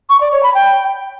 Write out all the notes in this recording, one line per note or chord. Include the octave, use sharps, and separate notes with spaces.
C#6
D5
C#5
B5
G5